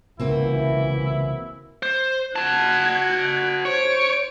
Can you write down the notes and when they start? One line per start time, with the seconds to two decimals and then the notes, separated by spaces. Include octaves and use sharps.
0.20 C2 C#3 E3 A#3 C4 E4 F#4
1.83 C5
2.36 F#4 A5 F#6 G#6
3.65 C5 C#5 D7